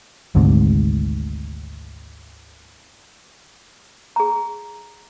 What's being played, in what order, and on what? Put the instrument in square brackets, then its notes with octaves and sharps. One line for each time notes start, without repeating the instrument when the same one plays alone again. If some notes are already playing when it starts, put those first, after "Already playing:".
[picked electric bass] G#1 D2 G#2 C3
[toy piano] G#4 A#5